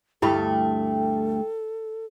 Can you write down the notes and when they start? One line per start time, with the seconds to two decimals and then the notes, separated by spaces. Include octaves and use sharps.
0.22 D2 G2 A3 E4 G4 A4 G5 B5